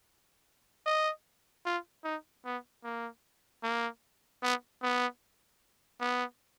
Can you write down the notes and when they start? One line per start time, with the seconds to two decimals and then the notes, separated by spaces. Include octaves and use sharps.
0.86 D#5
1.66 F4
2.04 D#4
2.45 B3
2.84 A#3
3.63 A#3
4.42 B3
4.83 B3
6.01 B3